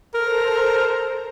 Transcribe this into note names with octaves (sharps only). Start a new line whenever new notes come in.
A4 A#4 C5 A#5